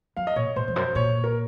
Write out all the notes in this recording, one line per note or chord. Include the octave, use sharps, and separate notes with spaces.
F#2 F5
D#5
A#2 C#5
A#2 C5
F2
F#2 C5
A#2 C#5
A#4